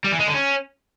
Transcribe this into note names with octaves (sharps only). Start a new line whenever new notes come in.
G3
E3
G#3
D3
C#4